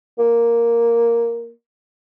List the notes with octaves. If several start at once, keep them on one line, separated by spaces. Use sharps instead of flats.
A#3